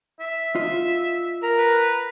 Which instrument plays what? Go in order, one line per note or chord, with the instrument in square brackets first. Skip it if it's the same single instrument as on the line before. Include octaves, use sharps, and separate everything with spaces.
[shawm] E5
[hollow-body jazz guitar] F4 D#5
[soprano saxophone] A#4
[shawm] B4